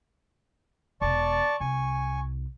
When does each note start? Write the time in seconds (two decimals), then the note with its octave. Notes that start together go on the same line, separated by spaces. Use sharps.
1.01 E1 B2 D5 A5 C#6
1.60 C2 G#5 C#6